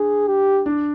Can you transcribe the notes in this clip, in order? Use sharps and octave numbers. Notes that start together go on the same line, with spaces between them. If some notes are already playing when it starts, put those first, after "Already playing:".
Already playing: D4 G#4
G4
D4